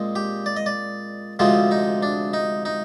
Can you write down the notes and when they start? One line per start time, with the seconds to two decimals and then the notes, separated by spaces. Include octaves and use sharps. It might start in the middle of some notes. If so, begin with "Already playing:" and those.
Already playing: A#2 G#3 C4
0.16 G4
0.46 D5
0.57 D#5
0.66 D5
1.39 D2 C3 F3 G#3 C4 F4
1.71 D#4
2.03 D4
2.34 D#4
2.65 D#4